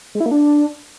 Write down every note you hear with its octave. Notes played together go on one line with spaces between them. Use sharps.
G#3
E4
A#3
D4